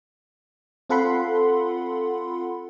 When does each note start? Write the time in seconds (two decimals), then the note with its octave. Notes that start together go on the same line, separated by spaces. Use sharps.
0.90 C4 F4 A4 F#5 B5 C6